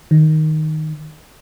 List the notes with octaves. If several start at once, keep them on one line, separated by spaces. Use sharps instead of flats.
D#3